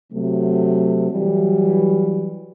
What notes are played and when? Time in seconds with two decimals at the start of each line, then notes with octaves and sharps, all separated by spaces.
0.13 C3 F#3 A3
1.11 E3 F#3 G3